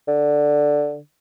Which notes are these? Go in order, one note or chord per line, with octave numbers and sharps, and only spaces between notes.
D3